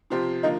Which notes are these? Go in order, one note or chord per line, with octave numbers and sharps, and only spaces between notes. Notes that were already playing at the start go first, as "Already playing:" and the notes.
C3 F3 C4 G4
D3 F3 A#3 D#4